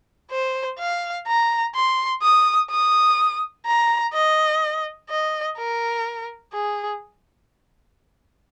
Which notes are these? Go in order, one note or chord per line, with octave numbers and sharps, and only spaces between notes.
C5
F5
A#5
C6
D#6
D#6
A#5
D#5
D#5
A#4
G#4